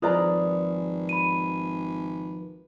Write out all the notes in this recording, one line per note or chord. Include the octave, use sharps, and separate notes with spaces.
G#1 F3 G#4 A#4 B4 D5 A#5
B5 D#7